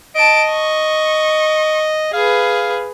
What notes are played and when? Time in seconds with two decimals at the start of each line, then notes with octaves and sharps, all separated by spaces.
0.15 D#5 A5 D7
0.51 C#6
2.13 G#4 B4 F5